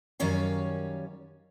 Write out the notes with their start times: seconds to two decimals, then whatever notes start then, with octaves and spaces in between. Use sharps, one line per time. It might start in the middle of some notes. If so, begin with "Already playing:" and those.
0.20 F#2 D#3 G3 C#4 C#5 F5